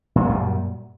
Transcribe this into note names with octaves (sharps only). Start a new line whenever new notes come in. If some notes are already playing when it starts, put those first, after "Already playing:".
F#2 A#2 F#3 G3